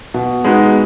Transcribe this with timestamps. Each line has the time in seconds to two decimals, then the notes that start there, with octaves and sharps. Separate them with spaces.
0.14 B2
0.44 G#3 B3 D#4 F#4